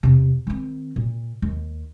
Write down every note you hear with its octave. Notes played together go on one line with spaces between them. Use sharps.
E2 C3
D#3 C4
A#2
D#2